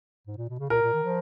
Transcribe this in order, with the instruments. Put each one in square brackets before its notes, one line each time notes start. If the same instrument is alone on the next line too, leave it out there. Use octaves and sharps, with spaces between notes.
[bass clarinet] G#2
A#2
B2
C#3
[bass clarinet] A#2 [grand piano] A#4
[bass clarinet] A#2
D#3
F3